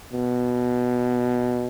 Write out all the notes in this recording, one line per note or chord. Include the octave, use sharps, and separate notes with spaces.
B2